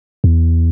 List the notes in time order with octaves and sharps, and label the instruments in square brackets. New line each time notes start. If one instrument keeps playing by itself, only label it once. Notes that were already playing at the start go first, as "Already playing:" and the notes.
[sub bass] E2